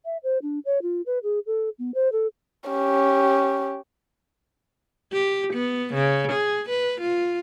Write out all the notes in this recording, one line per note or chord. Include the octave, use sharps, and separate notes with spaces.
E5
C5
D4
C#5
F4
B4
G#4
A4
B3
C5
A4
C#4 G4
G4
B3
C#3
G#4
B4
F4